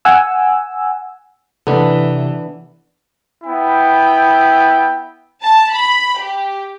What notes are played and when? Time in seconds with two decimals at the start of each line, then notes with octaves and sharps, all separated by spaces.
0.05 F#5 G#5 E6
1.67 C3 E3 B3 D4 A4
3.44 B3 E4 G5
5.43 A5
5.74 B5
6.20 G4